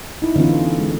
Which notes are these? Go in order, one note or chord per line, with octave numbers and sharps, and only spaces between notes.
D#4 E4
D3 E3 B3 C#4 F4
G#3